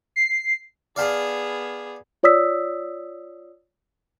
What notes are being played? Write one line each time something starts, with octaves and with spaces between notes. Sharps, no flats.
C7
B3 G#4 D5 F5 A5
F4 C#5 D5 D#6 E6 B6